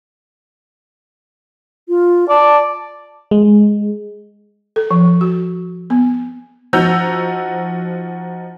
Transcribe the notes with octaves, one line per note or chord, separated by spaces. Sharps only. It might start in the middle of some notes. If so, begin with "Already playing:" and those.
F4
D5 A5
G#3
A4
F3
F#4
B3
F3 D#4 F#4 A#5 E6 G6